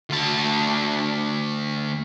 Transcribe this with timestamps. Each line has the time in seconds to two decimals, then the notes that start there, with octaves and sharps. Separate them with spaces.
0.09 D2 A5